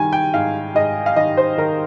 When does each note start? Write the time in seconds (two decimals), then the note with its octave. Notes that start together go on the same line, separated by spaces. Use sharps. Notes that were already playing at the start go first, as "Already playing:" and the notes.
Already playing: D#3 G3 G#5
0.13 G5
0.34 G#2 F5
0.75 G#2 D#5
1.06 F5
1.16 D#3 D#5
1.37 C5
1.58 D#3 A#4